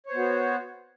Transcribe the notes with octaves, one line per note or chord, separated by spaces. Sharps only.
B3 F#4 C5 C#5